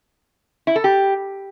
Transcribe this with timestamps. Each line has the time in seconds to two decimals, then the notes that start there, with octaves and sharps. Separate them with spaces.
0.67 E4
0.76 A4
0.84 G4